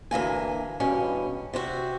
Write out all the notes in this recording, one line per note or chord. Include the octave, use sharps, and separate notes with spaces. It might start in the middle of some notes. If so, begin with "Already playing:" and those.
D2 E3 A#3 G#5
E2 G2 B2 C#4
C3 C4 F#4